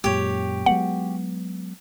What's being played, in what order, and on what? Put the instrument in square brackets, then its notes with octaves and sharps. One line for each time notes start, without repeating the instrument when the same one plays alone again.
[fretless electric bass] F#2 A#2 G#3 [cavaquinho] G4 C#5
[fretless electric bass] F#3 G#3 B3 [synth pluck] F#5